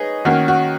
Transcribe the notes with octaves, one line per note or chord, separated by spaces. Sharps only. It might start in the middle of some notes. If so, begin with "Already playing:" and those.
Already playing: D#4 G#4 B4 C#5 D#5
D#3 A#3 C#4 F#4
F#4